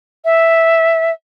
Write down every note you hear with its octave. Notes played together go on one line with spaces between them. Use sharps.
E5